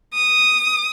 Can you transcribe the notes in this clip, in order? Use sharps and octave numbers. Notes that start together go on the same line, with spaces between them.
D#6